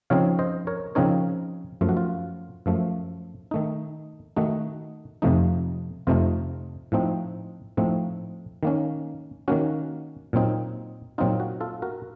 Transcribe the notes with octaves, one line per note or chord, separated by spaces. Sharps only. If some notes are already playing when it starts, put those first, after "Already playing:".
C#3 F3 C4 D#4 C#5 F5
C5 D#5
A#4 C#5
C#3 F3 C4 D#4 A#4 C#5
F#2 F3 A3 F4
F#4
F4
F#2 F3 A3
D#3 A3 D#4
D#3 A3 D#4 F#4
F2 C3 F3 A3 D#4
F2 C3 F3 A3 D#4 F4
A2 F3 A3 C4 D#4
A2 F3 A3 C4 D#4
D#3 A#3 C#4
D#3 A#3 C#4 F#4
A#2 F#3 C4 D#4
A#2 F#3 C4 D#4 F4
F#4
F4 A4
F#4 A#4